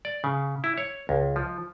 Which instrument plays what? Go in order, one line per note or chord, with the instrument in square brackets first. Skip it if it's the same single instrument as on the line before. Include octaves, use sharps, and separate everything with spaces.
[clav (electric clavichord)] D5
C#3
E4
C#5
C#2
F3